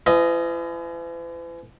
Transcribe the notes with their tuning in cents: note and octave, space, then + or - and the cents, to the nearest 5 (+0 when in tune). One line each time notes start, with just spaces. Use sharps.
E3 +45 D#5 +0